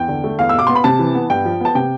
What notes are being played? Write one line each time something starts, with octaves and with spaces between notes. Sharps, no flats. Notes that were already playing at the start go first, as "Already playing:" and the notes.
Already playing: E2 G5
D3
A3
E2 F5
E6
B2
D6
B3 C6
B5
C3 A5
E3
B3
G2 G5
F3
B3 A5
C3 G5